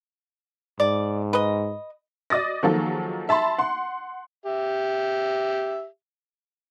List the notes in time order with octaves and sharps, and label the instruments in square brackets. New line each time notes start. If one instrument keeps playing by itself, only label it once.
[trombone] G#2 [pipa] D5
[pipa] B4 D#5
[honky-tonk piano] D5 D#5 D#6 A6 A#6
D#3 F3 F#3 A#3 G#4 A4
E5 A5 B5 C6
F#5 C6
[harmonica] G4 E5